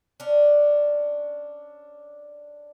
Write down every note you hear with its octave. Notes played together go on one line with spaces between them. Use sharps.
C#4 D4